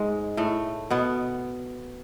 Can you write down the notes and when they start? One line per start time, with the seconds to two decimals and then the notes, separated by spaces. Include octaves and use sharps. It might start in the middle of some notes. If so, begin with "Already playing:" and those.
Already playing: G#2 G#3
0.37 A2 A3
0.90 B2 B3